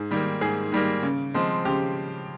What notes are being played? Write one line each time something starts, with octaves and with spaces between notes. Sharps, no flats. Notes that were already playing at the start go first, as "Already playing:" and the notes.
Already playing: G#2 G#4
D#3 G3 A#3
G#2 G#4
D#3 G3 A#3
C#3
F3 G#3 C4
C#3 G4